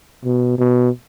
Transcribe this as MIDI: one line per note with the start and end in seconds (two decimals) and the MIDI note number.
0.25 0.57 47
0.59 0.89 47